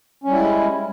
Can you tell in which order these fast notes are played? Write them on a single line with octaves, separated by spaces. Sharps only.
C#4 G3 E4 G#3